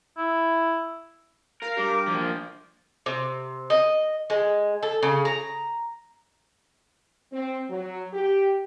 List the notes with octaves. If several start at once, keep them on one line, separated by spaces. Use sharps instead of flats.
E4
A#4 F5
G3 D4 G4 A#5 D6
F3 A#3
C3
D#5
G#3
A4
C#3
A#5
C4
F#3
G4